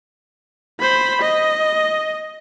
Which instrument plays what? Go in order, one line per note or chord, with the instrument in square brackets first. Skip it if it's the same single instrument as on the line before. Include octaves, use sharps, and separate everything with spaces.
[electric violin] C5 B5
D#5